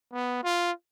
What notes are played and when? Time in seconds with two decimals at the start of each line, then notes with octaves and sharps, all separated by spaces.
0.13 B3
0.44 F4